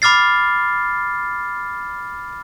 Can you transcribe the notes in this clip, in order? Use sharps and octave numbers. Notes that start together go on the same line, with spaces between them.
B5 D6 F6 A6 C7